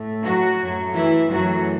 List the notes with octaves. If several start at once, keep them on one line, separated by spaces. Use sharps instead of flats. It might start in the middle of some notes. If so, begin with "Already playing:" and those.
Already playing: A2 A3
F#3 F#4
F#2 F#3 A3
E3 E4
F#2 E3 F#3 A3 F#4